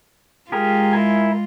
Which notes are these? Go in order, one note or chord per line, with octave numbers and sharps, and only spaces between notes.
G#3 F4 G4 G#4 A#4
E4 A#4 G#5